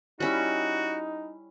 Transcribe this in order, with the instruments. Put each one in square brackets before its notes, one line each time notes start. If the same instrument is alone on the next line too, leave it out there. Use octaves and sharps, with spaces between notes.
[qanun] G3 C#4 E4 [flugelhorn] D#4 [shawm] F#4